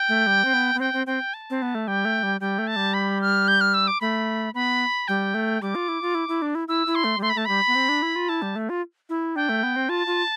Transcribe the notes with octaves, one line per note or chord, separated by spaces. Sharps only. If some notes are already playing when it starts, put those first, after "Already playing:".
Already playing: G5
A3
G3
C4
B3
B3
C4 G5
C4
C4 G5
A5
C4
B3
A3
G3 G5
A3
G3
G3 G5
A3
A5
G3
B5
F6
G6
F6
E6
D6
A3 B5
B3 B5
G3 G5
A3
G3 D6
F4
E4
F4
E4
E4
D4
E4
E4 E6
E4
C6
A3
G3
A3 C6
B5
A3 A5
G3 B5
B3
C4
D4
E4
F4
E4 A5
G3
A3
F4
E4
D4 G5
A3
B3
C4
F4 A5
F4